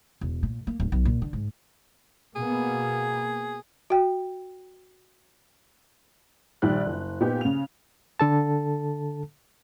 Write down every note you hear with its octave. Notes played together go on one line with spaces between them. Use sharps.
E1
A#2
A#3
D1
B1
A#2
D3
G#2
B2 A#3 B3 G#4
F#4 G5
A#1 D#3 G3 D5 F#6
F#1
A#2 B3 D#4 G4
C#3 F7
D3 A4 A5